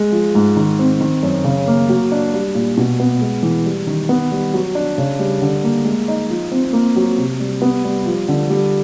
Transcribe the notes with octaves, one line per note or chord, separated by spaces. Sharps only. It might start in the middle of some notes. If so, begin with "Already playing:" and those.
Already playing: G#3
F3
G#2
D#3
C4
D#3
F#2
C#3
A#3
F#3
D4
G3
A#2
B2
B3
G#3
E3
G3
D#3
B3
G3
F#3
D4
C#3
G3
D3
A#3
G#3
D#4
F3
C4
A#3
F#3
C3
G3
B3
G3
F3
D3
G3